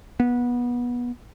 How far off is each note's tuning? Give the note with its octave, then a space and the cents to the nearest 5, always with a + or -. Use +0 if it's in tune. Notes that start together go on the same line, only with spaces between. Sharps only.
B3 -20